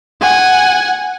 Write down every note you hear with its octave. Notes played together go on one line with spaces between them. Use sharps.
F#5 G#5